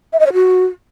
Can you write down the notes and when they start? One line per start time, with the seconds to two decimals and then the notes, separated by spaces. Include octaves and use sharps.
0.13 E5
0.20 D#5
0.26 C#5
0.33 F#4